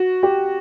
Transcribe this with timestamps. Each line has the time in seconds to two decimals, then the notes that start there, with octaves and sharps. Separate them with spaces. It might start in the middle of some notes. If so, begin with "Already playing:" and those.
Already playing: F#4
0.23 G4